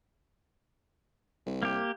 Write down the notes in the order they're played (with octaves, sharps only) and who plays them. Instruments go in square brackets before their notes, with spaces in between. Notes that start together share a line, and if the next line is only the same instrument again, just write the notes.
[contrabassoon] C2
[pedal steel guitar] A#3 G4